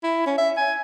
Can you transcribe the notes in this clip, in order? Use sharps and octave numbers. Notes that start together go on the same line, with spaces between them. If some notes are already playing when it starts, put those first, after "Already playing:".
E4
C#4
E5
G#5